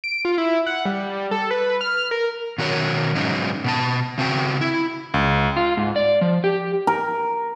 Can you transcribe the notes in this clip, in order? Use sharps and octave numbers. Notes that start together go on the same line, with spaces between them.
D7
F4
E4
F#5
G3
A4
B4
F6
A#4
B2 D#3 F#4 A#4 C5 C#5
G#2 F#3 C#4 D#4
B2 B3 A5
C#3 C4 F#4 G5
E4
C#2
F4
G#2
D5
F3
G4
A#4